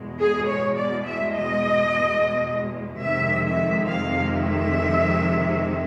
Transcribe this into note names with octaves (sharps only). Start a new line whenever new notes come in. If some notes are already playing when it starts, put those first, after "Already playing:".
Already playing: E2 B2 G#3
G#4
C#5
D5
E5
D#5
F2 C3 D#3 G#3 E5
E5
F5
E5